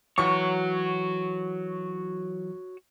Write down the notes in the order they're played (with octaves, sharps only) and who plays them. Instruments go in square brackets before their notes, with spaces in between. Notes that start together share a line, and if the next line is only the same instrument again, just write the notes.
[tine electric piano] E3 F#3 [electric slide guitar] F#4 C#5 [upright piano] C#6